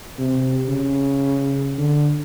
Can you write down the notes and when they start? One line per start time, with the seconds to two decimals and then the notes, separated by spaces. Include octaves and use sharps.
0.19 C3
0.68 C#3
1.78 D3